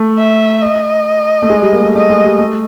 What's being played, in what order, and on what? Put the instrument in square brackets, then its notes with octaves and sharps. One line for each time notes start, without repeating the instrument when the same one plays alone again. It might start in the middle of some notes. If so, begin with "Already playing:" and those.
Already playing: [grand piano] A3
[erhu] E5
D#5
[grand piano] A3
G#3
G3
A#3
A3
[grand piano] A3 [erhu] D#5
[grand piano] G#3
G3
A3